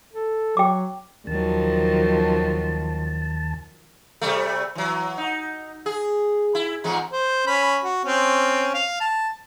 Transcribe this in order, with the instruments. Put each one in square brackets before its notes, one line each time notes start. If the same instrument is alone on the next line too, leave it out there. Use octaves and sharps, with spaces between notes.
[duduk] A4
[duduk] F#3 [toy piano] G5 D6
[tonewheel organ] D#2 A5 [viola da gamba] D#3 F3 F#3
[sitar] C3 G3 A3
E3 F#3
D#4
G#4
E4
E2 G#2 G#3
[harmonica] C5
C#4 B5
F#4
C4 C#4
F5
A5